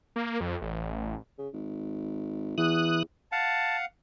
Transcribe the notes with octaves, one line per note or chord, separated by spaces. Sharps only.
A#3
F2
A1
C#3
G#1
E2 E3 D#6 F#6
F5 F#5 A5